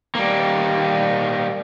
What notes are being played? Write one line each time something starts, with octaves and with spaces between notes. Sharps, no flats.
G3 A#3